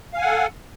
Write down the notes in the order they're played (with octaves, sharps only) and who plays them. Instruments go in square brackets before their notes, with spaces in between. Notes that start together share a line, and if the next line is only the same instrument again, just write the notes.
[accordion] F5
G#5
F#5
A4